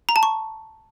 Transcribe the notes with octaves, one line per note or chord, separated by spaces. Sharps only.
A#5
A5
C#6